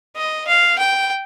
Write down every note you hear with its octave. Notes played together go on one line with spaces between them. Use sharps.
D#5
F5
G5